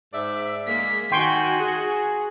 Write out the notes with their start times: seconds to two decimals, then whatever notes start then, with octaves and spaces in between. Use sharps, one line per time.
0.13 G#2 D5 E5
0.68 G#3 A#3 B6
1.12 D#3 F#4 G5 G#5 C6 C#6
1.59 G#4